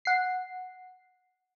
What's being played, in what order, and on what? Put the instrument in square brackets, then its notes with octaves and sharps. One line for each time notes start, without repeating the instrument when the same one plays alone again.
[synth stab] F#5 C7